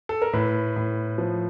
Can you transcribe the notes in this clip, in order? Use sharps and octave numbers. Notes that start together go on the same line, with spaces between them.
A4
A#4
A2 B4
A2
F3